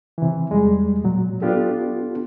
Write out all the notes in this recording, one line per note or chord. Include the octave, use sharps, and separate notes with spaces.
C3 E3
E2 G3 G#3
A#2 F#3
B3 D4 F4 G4 A4